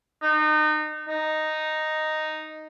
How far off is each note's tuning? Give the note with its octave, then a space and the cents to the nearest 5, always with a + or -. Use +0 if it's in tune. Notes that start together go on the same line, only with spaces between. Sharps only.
D#4 -30
D#4 -5